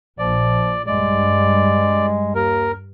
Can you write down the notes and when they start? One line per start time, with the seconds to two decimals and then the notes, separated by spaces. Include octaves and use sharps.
0.19 A#1 F3 D5
0.87 G2 G#3 D5
2.35 D#2 A#4